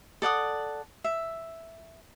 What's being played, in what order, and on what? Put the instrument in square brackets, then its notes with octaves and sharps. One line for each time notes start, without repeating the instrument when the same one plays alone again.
[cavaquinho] A4 D5 F#5 D#6
E5